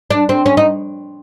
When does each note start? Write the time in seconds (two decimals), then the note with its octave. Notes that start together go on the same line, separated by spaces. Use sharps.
0.11 D4
0.29 C4
0.46 C#4
0.57 D#4